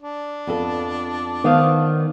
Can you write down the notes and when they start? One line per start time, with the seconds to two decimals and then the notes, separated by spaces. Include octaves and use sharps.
0.02 D4
0.47 F2 B3 A4
1.44 D#3 B3 C5 F5